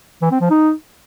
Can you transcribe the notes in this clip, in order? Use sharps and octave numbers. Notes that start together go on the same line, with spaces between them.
E3
C4
F3
D#4